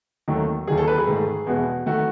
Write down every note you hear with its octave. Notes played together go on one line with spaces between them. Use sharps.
D#2 D#3 F#3 A3
D#2 D#3 F#3 G#4
A4
B4
G#4
G#2 D#3 A3
E2 B2 G#3 F#4
D#3 A3 F#4